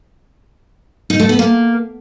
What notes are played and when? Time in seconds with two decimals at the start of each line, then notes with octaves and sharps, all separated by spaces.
1.10 D#4
1.20 A3
1.29 B3
1.39 A#3